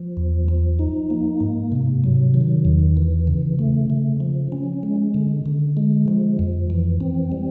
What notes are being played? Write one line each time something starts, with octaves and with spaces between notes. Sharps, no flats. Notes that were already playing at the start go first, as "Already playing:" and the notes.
Already playing: F3
E2
F3
D#4
A#3
G#2
C3
F#3
D#3
E2
E3
C#3
A3
C#3
F3
C#4
G#3
D3
D3
G#3
F3
F2
E3
C4
G3